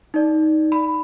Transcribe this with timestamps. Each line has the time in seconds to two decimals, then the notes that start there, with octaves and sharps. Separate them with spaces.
0.14 D#4 D5
0.72 B5